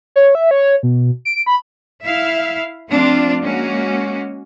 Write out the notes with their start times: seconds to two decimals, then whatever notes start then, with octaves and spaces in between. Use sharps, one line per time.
0.16 C#5
0.35 E5
0.51 C#5
0.83 B2
1.25 D7
1.46 B5
2.04 E4 E5 F5
2.89 F3 A3 C4 D4 F4
3.42 G#3 A#3 C#4 F#4